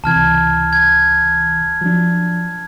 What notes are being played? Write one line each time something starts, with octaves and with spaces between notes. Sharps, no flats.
C#2 C3 E3 A5 F6 G#6
G#6
F3 F#3 D4